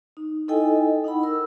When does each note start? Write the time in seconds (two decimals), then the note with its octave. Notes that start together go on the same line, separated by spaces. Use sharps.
0.17 D#4
0.48 D#4 E4 A4 D#5 G5 G#5
1.04 D#4 E4 F#5 B5
1.23 A#4 E6